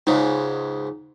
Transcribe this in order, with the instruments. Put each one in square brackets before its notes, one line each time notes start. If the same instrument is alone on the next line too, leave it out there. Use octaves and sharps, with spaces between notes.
[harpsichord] C#2 G#2 C#3 [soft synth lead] D#4